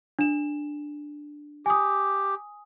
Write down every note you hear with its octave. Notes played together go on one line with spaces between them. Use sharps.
D4 E7
G4 G#5 D#6